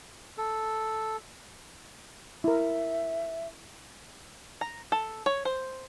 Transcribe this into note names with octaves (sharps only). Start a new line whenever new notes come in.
A4
E4 A#4 E5
A#5
A4
C#5
C5